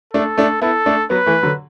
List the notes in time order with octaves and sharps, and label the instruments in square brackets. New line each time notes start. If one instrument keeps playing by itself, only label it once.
[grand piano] A3 D4 [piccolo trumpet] A4
[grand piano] A3 D4
[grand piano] B3 E4 [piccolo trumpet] A4
[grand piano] A3 D4
[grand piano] F#3 B3 [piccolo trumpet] B4
[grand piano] E3 A3
D3 F#3